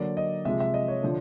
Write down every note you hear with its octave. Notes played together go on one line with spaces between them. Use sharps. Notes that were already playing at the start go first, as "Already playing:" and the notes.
Already playing: D3 F#3 A#3 D5
D#5
C3 F3 G#3 E5
E5
D#5
C#5
D3 F3